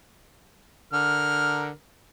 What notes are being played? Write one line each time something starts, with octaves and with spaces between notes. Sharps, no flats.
D3 A#4 F6